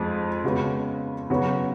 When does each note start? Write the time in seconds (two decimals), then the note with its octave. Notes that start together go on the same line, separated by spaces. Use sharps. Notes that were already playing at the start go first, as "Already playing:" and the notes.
Already playing: F2 F3 G#3
0.44 C#3 G#3 B3 F#4
1.30 C#3 F#3 B3 F#4